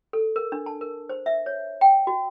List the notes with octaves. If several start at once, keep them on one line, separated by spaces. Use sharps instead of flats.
A4
A#4
D4
A5
A#4
C5
E5
C#5
G5
F#4